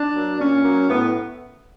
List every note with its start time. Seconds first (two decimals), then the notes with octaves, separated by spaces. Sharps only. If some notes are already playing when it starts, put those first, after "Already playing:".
Already playing: D4
0.15 F#3 A#3
0.39 A#2 C#4
0.64 F#3 A#3
0.89 A2 B3